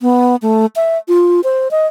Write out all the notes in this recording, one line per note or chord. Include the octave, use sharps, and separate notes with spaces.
B3
A3
E5
F4
C5
D#5